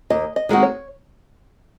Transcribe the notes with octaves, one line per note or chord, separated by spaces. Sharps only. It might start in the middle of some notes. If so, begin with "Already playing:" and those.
D#2 D#5
D#5
D#3 G#3 C4 F#4
C#5